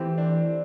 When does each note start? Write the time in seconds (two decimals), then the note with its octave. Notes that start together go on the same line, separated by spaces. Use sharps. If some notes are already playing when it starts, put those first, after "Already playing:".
Already playing: E3 A3 C4 E4 G4 C5
0.18 D4